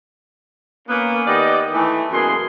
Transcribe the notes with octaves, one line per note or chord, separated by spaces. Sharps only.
A#3 B3 C#4
D#3 B3 G4 D5 D#5
E3 A3
F#2 B2 A#3 B3 G#4 C6